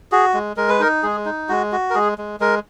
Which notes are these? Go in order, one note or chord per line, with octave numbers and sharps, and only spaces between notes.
F#4 G#4
G#3
G#3 A#4
B4
D#4 A#4
G#3 G#4
D#4
G#3 F#4
F#4
A#4
G#3 G#4
G#3
G#3 A#4